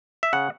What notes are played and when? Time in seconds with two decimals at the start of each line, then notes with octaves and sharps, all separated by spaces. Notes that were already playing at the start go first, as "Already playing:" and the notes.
0.23 E5
0.33 C#3 F#5